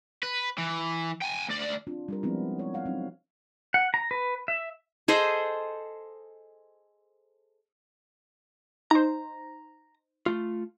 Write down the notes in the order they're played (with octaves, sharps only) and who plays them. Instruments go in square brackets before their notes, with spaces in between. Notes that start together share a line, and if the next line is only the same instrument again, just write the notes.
[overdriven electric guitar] B4
E3
G5 G#5
D2 D5
[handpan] C4 D4 F4
G3 D4 A#4
F3 G#3 B3 C4 D4 E4
C#5
F5 F#5
F#3 C4 C#4 D#4
[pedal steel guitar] F#5
A#5
B4
E5
[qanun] G#4 A4 C5 D#5
[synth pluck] D#4 C5 [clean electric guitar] A#5
[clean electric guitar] A3 F4